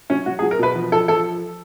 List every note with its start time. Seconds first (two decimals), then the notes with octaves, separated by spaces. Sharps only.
0.10 F#3 C#4
0.26 F#3 F#4
0.39 G#4
0.42 F#3
0.51 A#4
0.59 B2 B4
0.75 F3
0.92 F3 A4
1.08 F3 A4